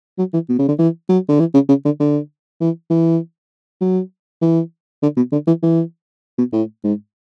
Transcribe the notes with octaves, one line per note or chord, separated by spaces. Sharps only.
F#3
E3
B2
C#3
D3
E3
F#3
D3
E3
C#3
C#3
D3
D3
E3
E3
F#3
E3
D3
B2
D3
E3
E3
B2
A2
G#2